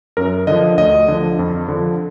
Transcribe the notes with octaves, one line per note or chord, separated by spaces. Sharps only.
F#2 A#4
D3 F3 D#5
D2 D#5
D3 F3
F2
D3 F3